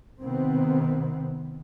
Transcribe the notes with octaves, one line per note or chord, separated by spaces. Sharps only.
C3 D#3 B3 C4